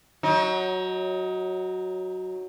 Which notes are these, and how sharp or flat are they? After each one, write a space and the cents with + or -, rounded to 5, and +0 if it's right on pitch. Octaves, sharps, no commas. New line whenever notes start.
F#3 +0 D#4 +25